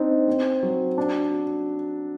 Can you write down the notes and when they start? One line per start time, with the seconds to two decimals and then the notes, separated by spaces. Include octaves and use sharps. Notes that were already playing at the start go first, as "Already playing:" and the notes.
Already playing: C4 D4 D#4
0.28 C4
0.63 F#3
0.98 D4
1.32 F#4